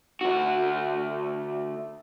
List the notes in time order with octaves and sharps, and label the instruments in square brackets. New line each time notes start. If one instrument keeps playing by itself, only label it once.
[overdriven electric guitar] D2 F#4